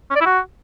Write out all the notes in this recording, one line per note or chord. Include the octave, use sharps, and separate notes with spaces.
C#4
D5
E4
F#4